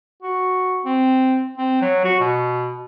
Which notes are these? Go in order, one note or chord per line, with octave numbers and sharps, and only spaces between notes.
F#4
C4
C4
F#3
F#4
B2